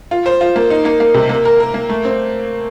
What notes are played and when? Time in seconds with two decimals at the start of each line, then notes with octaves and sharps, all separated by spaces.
0.11 F4
0.26 C5
0.41 F4
0.56 A#3
0.70 D#4
0.85 A#3
1.00 A#3
1.14 C3
1.29 A#3
1.45 A#4
1.60 A#4
1.74 A#3
1.89 A3
2.05 C4